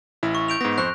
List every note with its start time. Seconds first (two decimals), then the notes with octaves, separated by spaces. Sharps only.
0.23 A1 E4
0.35 C#6
0.48 G6 D7 F7
0.61 G#2 B3 A#6
0.78 F2 C5 C#6 F#6